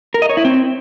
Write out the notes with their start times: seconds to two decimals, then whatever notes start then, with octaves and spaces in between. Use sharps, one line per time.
0.14 A#4
0.22 D#5
0.29 C#5
0.37 E4
0.45 C4